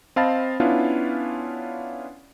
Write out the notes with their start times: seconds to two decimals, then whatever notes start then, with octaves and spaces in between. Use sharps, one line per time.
0.16 C4 D#5 F5 A5 B5 A6
0.60 B3 C#4 D4 E4 F4